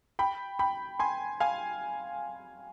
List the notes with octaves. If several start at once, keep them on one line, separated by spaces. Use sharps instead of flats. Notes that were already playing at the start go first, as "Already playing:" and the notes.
G5 B5
G5 B5
G#5 C6
F5 G#5